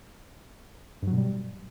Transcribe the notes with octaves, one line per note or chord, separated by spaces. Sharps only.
G2
F#3
B2
G3